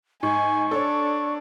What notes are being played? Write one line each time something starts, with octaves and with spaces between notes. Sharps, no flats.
G#2 G#5 C#6
D4 A4 C#5